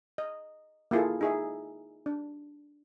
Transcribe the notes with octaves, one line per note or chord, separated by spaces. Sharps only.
D#5
A#3 E4 F4 G#4 A4
D#4 G#4 E5
D4